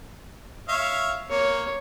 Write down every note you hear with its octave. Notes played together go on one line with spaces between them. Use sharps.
C#5 E5 F5
A#3 C#5